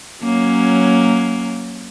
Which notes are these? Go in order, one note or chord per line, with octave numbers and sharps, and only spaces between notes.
F#3 A#3 C#4